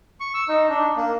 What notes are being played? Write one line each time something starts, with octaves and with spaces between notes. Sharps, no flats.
C#6
E6
D#4
D4
A#3